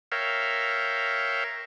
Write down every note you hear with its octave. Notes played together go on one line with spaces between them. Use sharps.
A#4 C#5 E5 F5 G5